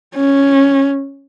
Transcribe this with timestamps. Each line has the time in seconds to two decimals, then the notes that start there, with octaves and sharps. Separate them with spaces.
0.15 C#4